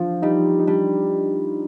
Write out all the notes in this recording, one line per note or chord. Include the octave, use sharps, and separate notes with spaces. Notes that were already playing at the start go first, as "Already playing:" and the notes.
Already playing: F3 D4 F4
G3 D#4
D#4
G3 D4